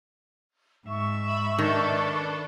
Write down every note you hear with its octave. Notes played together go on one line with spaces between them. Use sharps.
G#2 E5 C#6
B5
D#3 D4 A4 B4